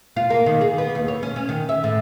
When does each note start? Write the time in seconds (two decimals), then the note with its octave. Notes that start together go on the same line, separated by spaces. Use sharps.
0.17 F4
0.30 A#3
0.46 D#3
0.61 G#4
0.78 B3
0.95 D#2
1.08 C#5
1.23 C#4
1.36 C#4
1.49 D#3
1.69 E5
1.84 A2